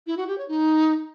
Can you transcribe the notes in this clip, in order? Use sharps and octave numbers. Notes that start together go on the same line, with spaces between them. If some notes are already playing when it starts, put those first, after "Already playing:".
E4
F#4
G4
C#5
D#4